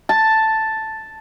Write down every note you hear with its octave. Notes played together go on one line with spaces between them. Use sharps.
A5